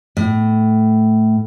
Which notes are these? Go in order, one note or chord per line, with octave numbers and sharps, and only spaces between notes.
A2